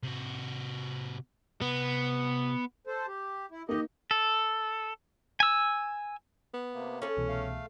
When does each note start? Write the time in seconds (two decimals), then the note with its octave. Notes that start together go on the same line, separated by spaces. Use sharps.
0.03 C3 F#4
1.62 C3 B3 B5
2.87 A4 C5
3.08 G4
3.51 E4
3.69 A#3 D#4 G4 D#5
4.11 A4
5.40 G#5 E6
6.54 B3
6.74 C3 A#3
7.02 C#4 G#4 A4
7.17 C2 B2 E3
7.28 A3 F5